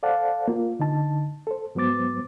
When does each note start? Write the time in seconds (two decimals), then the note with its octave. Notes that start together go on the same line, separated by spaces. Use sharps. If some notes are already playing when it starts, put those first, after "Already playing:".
0.03 A4 C5 D5 F5 F#5 A5
0.48 A#3 F4
0.80 D3 D#4 A5
1.47 A4 C5
1.75 G#2 F#3 B3 C5 D6 A6